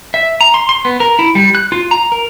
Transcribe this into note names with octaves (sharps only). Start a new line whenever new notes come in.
E5
A#5
C6
C6
B3
A#4
E4
G3
F#6
F4
A#5
A#4